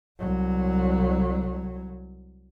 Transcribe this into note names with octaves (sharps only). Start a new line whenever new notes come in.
C2 F#3